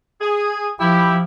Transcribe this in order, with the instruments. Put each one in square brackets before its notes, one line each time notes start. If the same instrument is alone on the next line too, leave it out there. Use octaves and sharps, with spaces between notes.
[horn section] G#4
[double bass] F3 [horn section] E4 [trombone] G4